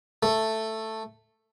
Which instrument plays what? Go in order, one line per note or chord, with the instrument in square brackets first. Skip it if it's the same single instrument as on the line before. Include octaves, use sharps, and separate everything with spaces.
[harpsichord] A3